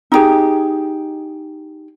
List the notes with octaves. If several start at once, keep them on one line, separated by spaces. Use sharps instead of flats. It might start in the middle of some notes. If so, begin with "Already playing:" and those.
D#4 E4 G4 G#4